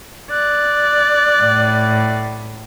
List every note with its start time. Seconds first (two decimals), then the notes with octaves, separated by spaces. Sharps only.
0.31 D5 F#6
1.41 A2